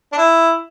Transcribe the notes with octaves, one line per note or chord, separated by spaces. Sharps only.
D4
E4